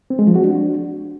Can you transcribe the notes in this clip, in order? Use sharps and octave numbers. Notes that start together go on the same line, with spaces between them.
C4
G#3
F3
F#4
D4